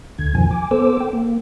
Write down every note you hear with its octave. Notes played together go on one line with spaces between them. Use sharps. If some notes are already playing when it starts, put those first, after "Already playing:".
D2 D3 G#6
F2 B2 D#3 F3 G#5
G#5 D6
B3 A4 C5 D6 E6
G5
A#3